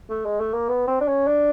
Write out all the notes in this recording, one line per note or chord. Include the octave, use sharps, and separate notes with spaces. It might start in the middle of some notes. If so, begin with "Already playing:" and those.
A3
G#3
A3
A#3
B3
C4
D4
C#4
D4